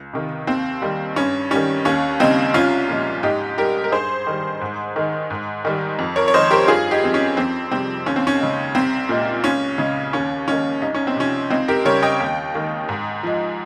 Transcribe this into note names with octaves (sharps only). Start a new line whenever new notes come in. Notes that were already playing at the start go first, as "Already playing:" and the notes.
Already playing: C#2
C3 D#3
D#2 C4
D#3 G3
G2 C#4
D#3 G3 C#4
D#2 C#4
C#3 G3 C4 D#4
C2 C#4 F4
A#2 F3 G#3
G#2 D#4 G4
G3 G4 A#4
A#4
G2 G#4 C5
D#3 G3
G#2
D#3 G#3
G#2
D#3 G3
F2
A#4 C#5
C#5
D#3 G#3 C5 D#5
G4 A#4
G2 F4 G#4
D#4 G4
F3 G#3 C4
C#4
F2 C4
C3 G3 C4
D#2 C#4
C4
C#4
C#3 G#3
C2 C4
A#2 G#3
C#2 C#4
C#3 G#3
D#2 C#4
D#3 G#3 C#4
C2 D#4
C#4
C4
C3 F3 C#4
C#2 C4 D#4
G4 A#4
C#3 G3 A#4 C#5
D#5 G5
D#2
D#3 G#3
G#2
F3 G#3